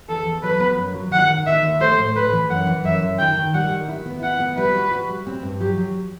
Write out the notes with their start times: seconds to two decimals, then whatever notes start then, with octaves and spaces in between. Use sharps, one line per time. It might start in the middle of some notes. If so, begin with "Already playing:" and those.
0.09 E2 A4
0.25 E2
0.42 F#3 B4
0.60 B3
0.78 F#2
0.94 F#3
1.11 D#3 F#5
1.29 D#3
1.46 D#3 E5
1.63 D#2
1.80 A3 C5
1.99 A2
2.15 A2 B4
2.32 E3
2.50 F#2 F#5
2.67 E3
2.84 F#2 E5
3.02 F#2
3.18 D#3 G5
3.37 D#3
3.54 G3 F#5
3.71 D#3
3.89 E4
4.06 B3
4.22 E4 F#5
4.40 B3
4.57 G3 B4
4.74 F#4
4.91 F#4
5.09 G3
5.27 C4
5.43 G2
5.60 F#3 G4
5.78 F#3